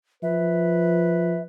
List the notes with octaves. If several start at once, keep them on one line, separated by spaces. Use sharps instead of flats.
F3 B4 E5